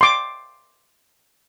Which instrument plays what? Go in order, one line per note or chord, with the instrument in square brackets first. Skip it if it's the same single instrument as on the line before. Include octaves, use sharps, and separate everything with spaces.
[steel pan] C6 D6